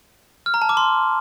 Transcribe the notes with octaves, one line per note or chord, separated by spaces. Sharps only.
F6
A#5
A5
D6
C6